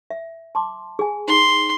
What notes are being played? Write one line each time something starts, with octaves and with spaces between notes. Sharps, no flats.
E5
A5 C6 D6
G#4 G#5
D#4 G#4 C6